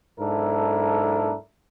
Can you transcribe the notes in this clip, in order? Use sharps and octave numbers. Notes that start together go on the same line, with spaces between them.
B1 G#2 D4 E4 A4 A#4